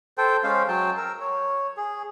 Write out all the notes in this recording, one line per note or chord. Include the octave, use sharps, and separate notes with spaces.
A4 C5 G5
G#3 C#4 C5 F5
F#3 G5 A5
A#4 E6
C#5
G#4